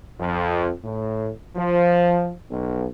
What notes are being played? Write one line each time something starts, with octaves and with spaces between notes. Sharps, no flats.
F2
A2
F3
B1